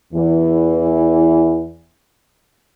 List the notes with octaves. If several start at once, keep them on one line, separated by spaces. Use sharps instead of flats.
E2 E3